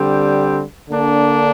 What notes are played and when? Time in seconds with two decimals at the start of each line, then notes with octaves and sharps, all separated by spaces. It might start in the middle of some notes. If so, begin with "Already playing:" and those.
Already playing: D3 G3 C4
0.89 D3 A#3 D4